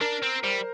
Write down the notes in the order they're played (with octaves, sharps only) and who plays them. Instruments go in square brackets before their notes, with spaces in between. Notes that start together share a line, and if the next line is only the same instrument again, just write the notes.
[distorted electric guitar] D4 [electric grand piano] A#4
[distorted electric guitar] C4
[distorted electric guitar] G3 [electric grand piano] C5